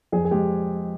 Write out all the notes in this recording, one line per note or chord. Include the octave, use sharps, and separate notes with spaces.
F2 G#4
G#4
G#3 G4